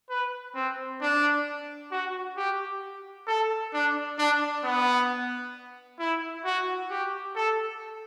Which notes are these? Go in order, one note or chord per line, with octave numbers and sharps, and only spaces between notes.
B4
C4
D4
F#4
G4
A4
D4
D4
B3
E4
F#4
G4
A4